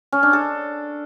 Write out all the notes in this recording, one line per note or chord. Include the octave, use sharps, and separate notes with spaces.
C#4
D4
A4